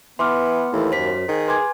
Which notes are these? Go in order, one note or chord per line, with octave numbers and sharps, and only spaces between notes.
E3 B3 C6 D6 F6
D#2 E3 A3 E4
F#2 C5 B6
D#3 G#4
B4 G#5 C6 D6 G#6